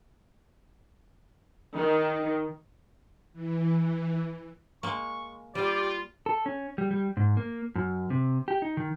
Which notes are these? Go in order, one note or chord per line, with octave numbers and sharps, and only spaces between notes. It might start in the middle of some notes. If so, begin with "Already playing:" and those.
D#3
E3
G#3 A#3 C#6
G3 F4 G4 D5
A4
C#4
G3
G3
G#2
A#3
F#2
C3
G4
D#4
D#3